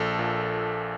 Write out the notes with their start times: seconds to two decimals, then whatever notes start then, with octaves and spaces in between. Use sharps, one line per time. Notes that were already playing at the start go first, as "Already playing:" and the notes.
Already playing: A#1 A4
0.19 A#2